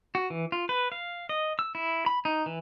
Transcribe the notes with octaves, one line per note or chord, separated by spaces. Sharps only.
F#4
E3
F4
B4
F5
D#5
E6
E4
B5
D#4
E3